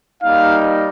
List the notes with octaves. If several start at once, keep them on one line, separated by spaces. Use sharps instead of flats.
G3 A#3 D#4 F5